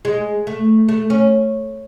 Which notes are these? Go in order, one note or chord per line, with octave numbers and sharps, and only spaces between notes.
G#3
A3
A3
C#4